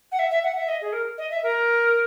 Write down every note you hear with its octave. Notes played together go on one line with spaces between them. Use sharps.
F#5
E5
E5
F#5
E5
D#5
G#4
A#4
D#5
E5
A#4